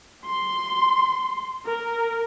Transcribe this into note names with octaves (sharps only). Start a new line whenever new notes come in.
C6
A#4